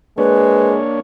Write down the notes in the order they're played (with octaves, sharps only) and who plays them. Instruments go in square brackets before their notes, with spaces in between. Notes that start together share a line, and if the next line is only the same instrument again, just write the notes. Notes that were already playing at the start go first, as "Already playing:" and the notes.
[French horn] G#3 [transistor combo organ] A#3 D4 C#5 [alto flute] B4